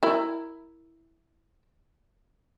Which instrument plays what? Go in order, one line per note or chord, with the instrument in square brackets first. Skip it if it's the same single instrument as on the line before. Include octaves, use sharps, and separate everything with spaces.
[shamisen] E4 A#4